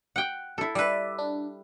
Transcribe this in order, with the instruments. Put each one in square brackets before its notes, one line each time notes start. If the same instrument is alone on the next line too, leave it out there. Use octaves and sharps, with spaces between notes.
[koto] F#5 G5
E4 A4
[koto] G3 B4 [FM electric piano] D5 E5
[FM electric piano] D4